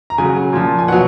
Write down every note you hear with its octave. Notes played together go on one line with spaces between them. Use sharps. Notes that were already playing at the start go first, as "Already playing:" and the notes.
A#5
C#3 F#3 G#5
A#2 F3
G#5
B2 F#3 F#5